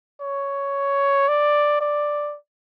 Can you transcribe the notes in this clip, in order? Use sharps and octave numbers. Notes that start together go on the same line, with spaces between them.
C#5
D5
D5